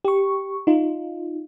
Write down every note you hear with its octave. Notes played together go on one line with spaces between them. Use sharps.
G4 C#6
D#4 F4